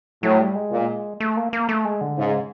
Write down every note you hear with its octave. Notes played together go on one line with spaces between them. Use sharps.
A2 F#3
G3
G#3
A#2
A3
A#3
A#3
A3
G#3
D3
G#2 C#3